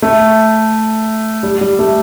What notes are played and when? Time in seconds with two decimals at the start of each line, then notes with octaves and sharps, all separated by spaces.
0.02 A3
1.43 G3
1.61 G3
1.79 A3